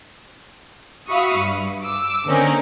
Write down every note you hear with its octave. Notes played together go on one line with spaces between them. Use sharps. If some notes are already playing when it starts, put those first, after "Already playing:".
F#4 E5 F5 B5 C#6 D#6
G2
D6 E6
D3 A#3 C4 C#4 D#4 A#4